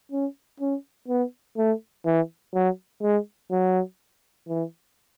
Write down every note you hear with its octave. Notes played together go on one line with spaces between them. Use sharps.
C#4
C#4
B3
A3
E3
F#3
G#3
F#3
E3